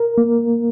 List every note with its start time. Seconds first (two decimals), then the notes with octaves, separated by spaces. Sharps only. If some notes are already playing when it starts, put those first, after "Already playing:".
Already playing: A#4
0.18 A#3